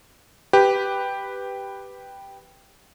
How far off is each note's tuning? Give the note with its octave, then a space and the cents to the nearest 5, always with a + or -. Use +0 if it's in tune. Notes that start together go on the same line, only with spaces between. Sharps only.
G4 +0 B4 +0